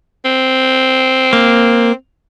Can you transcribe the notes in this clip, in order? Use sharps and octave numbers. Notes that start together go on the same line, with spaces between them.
C4
A#3